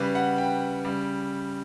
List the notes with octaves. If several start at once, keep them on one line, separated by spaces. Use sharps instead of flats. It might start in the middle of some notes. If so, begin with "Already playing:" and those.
Already playing: C#3 G3 B4
F#5
G5
C#3 G3